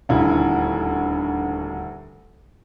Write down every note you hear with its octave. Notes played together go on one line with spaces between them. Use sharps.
D#1 D2 E4